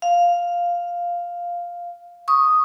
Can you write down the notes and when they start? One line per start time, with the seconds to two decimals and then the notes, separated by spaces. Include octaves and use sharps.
0.02 F5
2.28 C#6 D#6